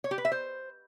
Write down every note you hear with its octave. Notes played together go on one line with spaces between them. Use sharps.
C#5
G4
B4
E5
C5